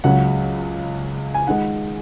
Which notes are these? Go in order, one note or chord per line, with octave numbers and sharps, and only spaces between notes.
C#2 C#3 F#3 F#5
G#5
D#3 G#3 F#5